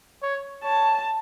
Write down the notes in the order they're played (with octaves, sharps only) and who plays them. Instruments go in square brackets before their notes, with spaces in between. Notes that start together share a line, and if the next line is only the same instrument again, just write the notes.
[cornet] C#5
[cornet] C#5 [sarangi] A5